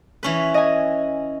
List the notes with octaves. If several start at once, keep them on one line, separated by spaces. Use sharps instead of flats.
E3 C#4 B4
D#5 G#5